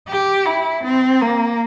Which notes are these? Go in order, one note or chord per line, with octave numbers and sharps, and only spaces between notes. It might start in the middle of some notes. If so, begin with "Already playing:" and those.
G4
E4
C4
A#3